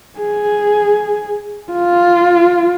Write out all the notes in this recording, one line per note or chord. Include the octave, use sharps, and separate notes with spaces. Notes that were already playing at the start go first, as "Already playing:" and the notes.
G#4
F4